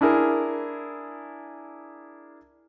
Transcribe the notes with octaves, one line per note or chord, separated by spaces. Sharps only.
D4 E4 G#4 A#4